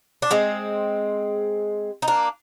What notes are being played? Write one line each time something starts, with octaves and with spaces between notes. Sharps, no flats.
D4
G#3 C4
D#4
A#3 D4